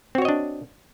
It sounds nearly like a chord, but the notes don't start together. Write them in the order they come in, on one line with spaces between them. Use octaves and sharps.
C4 F#4 C#5 D#5 D4